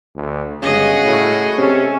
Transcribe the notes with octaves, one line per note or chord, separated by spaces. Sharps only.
D2
G1 C#3 G#3 F#4 G#4 D#5
A2
C3 C#4 A4